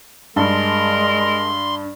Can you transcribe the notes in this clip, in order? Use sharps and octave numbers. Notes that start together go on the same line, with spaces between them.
G2 G#3 A#4 A5 C6